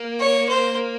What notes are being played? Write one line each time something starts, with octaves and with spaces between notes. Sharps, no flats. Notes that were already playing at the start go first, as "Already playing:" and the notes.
Already playing: A#3
C#5
C5